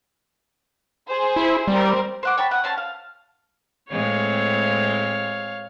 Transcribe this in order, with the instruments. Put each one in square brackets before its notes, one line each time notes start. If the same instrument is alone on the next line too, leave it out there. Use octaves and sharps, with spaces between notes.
[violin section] G#4 C5
[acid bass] E4
[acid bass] G3 [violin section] C4 A#4
[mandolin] C5 F#5 D6
C#5 G5 A5 B5
F#5 D#6
C#4 C5 A5
F5
[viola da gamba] A2 G#3 C4 [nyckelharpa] C#5 F5